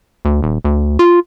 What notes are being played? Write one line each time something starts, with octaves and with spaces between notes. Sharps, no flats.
D2
D#1
D2
F4